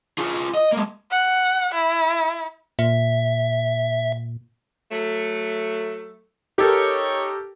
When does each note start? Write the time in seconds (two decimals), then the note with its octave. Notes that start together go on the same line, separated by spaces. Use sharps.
0.18 F4 G#4
0.54 D#5
0.73 G#3 A#3
1.11 F#5
1.74 E4
2.79 A#2 E5
4.92 F#3 A3
6.58 D#4 G4 A4 A#4 C#5